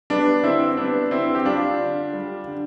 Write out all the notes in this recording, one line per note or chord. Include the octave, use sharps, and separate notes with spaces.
G3 B3 D4
D3 C4 E4
G3 B3 D4
D3 C4 E4
G4
G3 D4 F4
D3
G3
D3